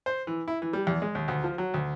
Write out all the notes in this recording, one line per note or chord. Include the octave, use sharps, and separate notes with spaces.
C5
E3
E4
E3
G3
E2
G#3
D#2
D2
F3
F#3
D2